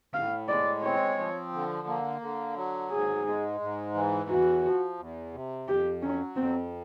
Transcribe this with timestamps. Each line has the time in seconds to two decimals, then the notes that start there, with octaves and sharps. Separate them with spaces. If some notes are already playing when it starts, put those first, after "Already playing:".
0.14 A2 F5
0.48 G#3 D5
0.83 C4 C#5
1.18 F3
1.53 D3
1.87 A#3
2.21 D3
2.56 F#3
2.91 G#2 G#4
3.26 G#3
3.61 G#2
3.94 E3
4.29 E2 F#4
4.64 F3
4.99 E2
5.33 C3
5.68 F2 G4
6.02 F#3 C#4
6.36 F2 C4